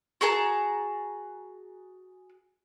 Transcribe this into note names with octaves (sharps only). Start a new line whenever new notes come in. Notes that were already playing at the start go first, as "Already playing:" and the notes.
F#4 G#4 A5 A#5